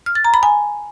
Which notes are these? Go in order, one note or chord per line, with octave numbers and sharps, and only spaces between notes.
F6
A6
A#5
B5
G#5